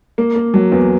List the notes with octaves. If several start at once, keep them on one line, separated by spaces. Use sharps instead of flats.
A#3
A#3
F#3
E2